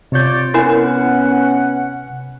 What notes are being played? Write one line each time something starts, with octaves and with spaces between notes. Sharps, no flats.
C3 F4 C#5 D5 G6
B3 C#4 E4 A#4 F#5 G#5